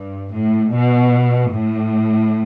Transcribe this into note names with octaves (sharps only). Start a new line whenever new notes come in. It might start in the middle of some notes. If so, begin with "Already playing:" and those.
Already playing: G2
A2
B2
A2